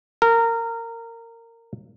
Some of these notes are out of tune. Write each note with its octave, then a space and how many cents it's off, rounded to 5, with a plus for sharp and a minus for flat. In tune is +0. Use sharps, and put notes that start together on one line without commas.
A#4 -20